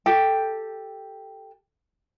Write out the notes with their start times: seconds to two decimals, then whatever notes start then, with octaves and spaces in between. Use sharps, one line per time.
0.06 G4 A4 G5